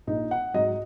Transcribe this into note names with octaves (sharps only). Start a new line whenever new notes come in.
A#1 D#4
F#5
G#2 F#3 D#5